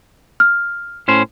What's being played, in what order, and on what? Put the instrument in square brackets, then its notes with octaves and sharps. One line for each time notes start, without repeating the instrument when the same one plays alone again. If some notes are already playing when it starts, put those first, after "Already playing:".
[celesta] F6
[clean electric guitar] A2 C#4 C5